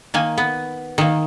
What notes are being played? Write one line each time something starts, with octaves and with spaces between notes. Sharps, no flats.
D#3 A#3 G#5
B3
D#3 A#3